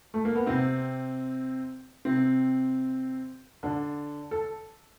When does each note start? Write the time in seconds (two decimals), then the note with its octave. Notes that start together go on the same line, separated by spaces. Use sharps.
0.14 A3
0.25 A#3
0.35 B3
0.46 C3 C4
2.05 C3 C4
3.63 D3 D4
4.31 A4